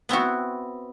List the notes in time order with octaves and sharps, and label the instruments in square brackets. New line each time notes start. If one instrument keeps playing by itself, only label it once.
[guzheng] B3 C4 E4 F#4